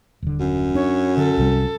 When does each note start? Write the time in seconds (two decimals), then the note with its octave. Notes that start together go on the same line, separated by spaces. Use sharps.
0.22 D#1 D3
0.40 F#2
0.75 D4 C#5
1.17 D3 A4
1.37 C2 C3 G3